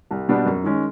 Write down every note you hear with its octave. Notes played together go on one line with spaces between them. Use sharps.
C2
B2 G3 B3 D4
F#2
D#3 G#3 C#4